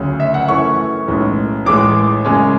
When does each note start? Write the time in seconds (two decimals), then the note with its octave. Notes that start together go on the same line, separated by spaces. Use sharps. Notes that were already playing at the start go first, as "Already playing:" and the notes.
Already playing: D2 C#3 F#3
0.20 E5
0.34 F#5
0.48 F#2 E3 A3 C#4 C#6
1.08 B1 A2 E3 G#3 C#4
1.66 A1 A2 E3 G#3 D6
2.25 F#2 C#3 G#3 C#4